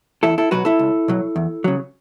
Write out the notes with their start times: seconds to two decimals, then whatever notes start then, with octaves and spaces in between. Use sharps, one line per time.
0.23 E2 E4 A4
0.38 E4 A4
0.51 B2 F#3 F#4 B4
0.65 E4 A4
0.79 C#2
1.08 B2 F#3
1.36 E2
1.64 C#3 F#3